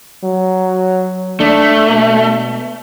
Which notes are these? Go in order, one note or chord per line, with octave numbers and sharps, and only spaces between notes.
F#3
A3 D4
B2